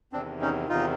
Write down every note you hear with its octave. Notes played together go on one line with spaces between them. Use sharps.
E2 C3 D#3 C4 D4
C#4 D#4
E2 C3 D#3 D#4 F4